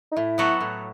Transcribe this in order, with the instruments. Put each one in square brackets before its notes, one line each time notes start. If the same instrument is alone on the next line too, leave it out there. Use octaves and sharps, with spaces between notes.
[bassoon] D#4
[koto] A2 [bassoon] E4
[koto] F#3 B3 F#4 A4
A2